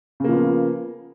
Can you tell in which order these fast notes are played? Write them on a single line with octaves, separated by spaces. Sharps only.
C#3 A#3 F3 B3